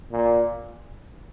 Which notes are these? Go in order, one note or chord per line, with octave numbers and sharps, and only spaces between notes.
A#2